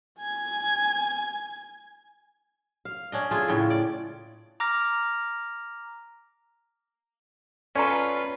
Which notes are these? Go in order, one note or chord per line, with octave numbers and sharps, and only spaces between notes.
G#5 G#6
F5
C#4 D4 D#5
A3 F4 G#4
A2 C#3
D5
A#5 D6 F6 A#6
C#4 F4 A4 B4 D5 A#5 C6